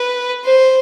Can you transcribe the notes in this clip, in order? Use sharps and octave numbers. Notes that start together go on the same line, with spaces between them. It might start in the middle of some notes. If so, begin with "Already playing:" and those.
Already playing: B4
C5